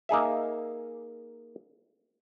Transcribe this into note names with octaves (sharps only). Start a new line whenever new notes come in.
A#3 D#4 G#4 E5